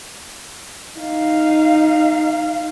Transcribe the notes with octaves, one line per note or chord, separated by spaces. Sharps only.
D#4 F5